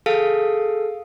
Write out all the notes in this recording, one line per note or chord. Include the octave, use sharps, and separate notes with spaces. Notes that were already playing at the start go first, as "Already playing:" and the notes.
G#4 A4 F5